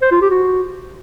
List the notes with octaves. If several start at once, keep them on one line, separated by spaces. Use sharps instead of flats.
C5
F4
G4
F#4